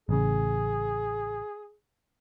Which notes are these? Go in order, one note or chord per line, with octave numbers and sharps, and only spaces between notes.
A1 C#3 G#4